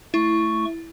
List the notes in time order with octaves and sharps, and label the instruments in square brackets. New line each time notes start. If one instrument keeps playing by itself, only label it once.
[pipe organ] A3 C#6 [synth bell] E4